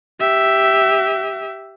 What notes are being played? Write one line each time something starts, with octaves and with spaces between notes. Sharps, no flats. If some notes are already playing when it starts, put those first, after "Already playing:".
G4 E5